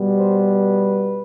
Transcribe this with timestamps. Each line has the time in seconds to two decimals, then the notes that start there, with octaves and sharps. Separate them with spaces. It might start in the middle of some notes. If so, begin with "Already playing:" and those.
Already playing: B2 G3 B3
0.18 C5
0.48 B4